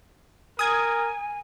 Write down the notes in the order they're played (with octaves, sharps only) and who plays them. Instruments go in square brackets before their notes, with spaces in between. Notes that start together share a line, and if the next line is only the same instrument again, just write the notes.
[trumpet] A#4 [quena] G#5 [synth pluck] D#6 G#6